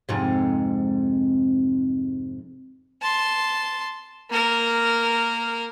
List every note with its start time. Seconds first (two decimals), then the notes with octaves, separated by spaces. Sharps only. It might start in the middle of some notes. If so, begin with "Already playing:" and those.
0.09 F2 G#2 C3
3.02 A5 C6
4.30 A#3 A#4